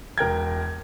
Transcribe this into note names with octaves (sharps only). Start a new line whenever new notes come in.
E1 A#4 G5 G#6